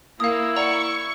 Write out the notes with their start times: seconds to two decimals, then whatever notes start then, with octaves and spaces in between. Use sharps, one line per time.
0.20 A#3 E4 F5 D#6
0.56 D5 F#5 A#5 C#6